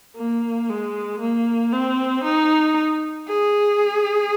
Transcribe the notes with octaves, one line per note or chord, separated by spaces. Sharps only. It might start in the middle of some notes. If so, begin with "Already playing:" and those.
A#3
G#3
A#3
C4
D#4
G#4